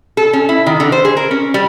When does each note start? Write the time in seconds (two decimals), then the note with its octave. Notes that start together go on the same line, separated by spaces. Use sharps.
0.17 A4
0.33 C#4
0.49 E4
0.66 D#3
0.80 D3
0.92 C5
1.05 G#4
1.17 A#4
1.31 C#4
1.54 G3